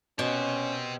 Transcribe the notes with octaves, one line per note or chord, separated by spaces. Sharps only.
B2 C#4 G4 C5